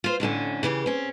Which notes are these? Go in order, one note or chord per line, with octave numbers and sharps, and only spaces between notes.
F4 C5
F2 A2 D3 C#4
C#3 E3 G4
C4 C#4